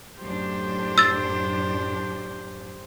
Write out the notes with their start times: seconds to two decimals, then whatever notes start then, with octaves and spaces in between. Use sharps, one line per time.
0.19 F#2 A2 D4 G4 C5
0.98 E6 A6